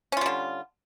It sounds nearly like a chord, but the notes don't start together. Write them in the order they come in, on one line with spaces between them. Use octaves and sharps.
C#4 F4 G3 D3